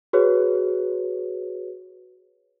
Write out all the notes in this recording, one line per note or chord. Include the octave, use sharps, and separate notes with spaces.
F#4 G#4 B4 C#5